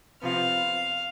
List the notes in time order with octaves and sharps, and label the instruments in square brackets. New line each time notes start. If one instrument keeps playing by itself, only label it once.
[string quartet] C3 F3 B3 F5